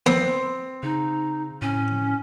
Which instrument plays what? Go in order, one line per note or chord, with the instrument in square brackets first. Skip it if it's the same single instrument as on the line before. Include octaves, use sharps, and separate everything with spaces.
[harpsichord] B3 [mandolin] C4
[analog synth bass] C#3 [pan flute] D#4
[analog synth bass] A2 [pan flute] C#4